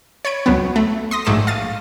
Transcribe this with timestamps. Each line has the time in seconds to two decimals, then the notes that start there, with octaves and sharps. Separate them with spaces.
0.25 C#5 B5 G#6 D7
0.46 C#2 F#3 B3
0.76 A3
1.11 C6 D#6 A#6
1.25 A#1 G#2 A3 D6 E7
1.47 F5 A6 D#7